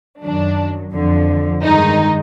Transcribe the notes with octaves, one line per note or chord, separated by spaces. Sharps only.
F#2 D#3 F#3 D4
F2 D3 F3
G2 D#3 G#3 D#4